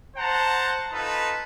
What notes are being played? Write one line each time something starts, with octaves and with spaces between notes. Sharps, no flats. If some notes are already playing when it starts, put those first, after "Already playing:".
C5 F#5 A5 A#5
D#4 F4 A4 B4